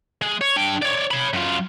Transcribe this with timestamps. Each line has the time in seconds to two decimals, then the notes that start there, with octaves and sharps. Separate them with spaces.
0.22 G#3
0.41 C#5
0.57 D4 G5
0.82 C#5 D5
1.11 C#5 B5
1.33 F#2 F4